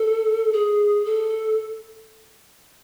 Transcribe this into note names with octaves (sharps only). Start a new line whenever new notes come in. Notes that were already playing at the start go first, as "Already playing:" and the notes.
Already playing: A4
G#4
A4